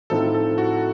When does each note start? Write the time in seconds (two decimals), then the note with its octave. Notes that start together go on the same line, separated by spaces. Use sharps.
0.10 A2 F3 C4 D#4 A4
0.34 A4
0.58 F#4